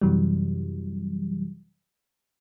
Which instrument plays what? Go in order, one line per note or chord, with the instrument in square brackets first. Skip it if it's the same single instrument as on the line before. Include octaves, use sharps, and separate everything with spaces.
[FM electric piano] F#2 C3 E3 F#3 G3